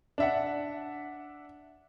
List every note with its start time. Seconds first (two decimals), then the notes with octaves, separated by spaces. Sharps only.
0.18 D4 E5 F#5